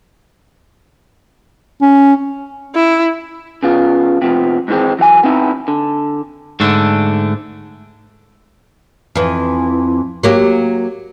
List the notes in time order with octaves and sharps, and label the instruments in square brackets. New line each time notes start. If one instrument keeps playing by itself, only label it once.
[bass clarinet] C#4
[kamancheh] E4
[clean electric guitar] C#3 B3 F4
C3 F3 B3
G#2 D#3 E3 G#3 C4
E3 F#3 F5 G#5
B3 C4 D#4 E4
D3
G#2 D3 A3 D4
[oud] F2 E3
F#3 A#3 G4